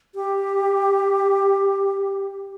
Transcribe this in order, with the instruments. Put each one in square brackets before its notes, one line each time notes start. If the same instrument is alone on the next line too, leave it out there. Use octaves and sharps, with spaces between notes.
[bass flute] G4